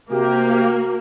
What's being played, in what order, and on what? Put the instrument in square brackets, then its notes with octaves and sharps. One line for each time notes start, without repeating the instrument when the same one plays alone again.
[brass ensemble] C3 G4 [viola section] A#3 [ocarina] F#4